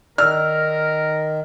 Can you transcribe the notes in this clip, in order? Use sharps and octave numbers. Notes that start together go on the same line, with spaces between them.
D#3 A#4 D5 E6 F6